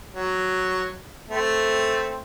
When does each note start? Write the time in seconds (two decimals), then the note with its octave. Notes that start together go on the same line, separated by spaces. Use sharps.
0.14 F#3
1.30 A3 C4